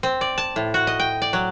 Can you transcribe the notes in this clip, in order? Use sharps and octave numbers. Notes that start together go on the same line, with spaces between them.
C4
D5
A5
A2
F#4
D#5
G5
D5
F#3